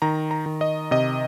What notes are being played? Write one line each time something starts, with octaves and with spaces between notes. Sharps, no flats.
D#3 A#5
A#5
D#3
D#5
C3 D#5